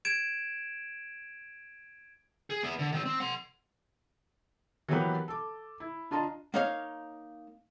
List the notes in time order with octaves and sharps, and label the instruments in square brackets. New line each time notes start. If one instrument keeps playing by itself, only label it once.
[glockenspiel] G#6 D7 E7
[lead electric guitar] G#4
B3 E4
D3
D#3 C4
C4
F#5 C6
[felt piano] E3 F#3 A#3 B3 G4 B4
A4 D6
E4
D4 F4 D#5 A5 A#5
[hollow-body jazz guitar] A#3 D#4 C#5 F5